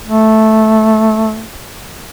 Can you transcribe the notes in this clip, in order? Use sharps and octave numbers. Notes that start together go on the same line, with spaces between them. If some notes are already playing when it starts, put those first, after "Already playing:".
A3